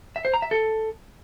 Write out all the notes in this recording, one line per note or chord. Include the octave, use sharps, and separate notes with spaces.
E5
C5
A#5
E5
A4